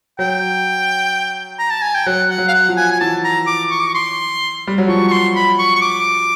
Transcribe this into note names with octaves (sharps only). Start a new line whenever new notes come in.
F#3 G5
A#5
A5
G#5
G5
F#3 F#5
F#5
F#3
F5
F#5
F3
G#5
G#5
E3 A5
A#5
D6
C#6
D6
C#6
C6
G3
F#3
F3 C#6
C#6
C6
B5
C#6
C#6
D6